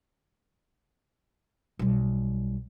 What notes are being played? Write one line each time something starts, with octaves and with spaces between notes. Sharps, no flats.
B1 G3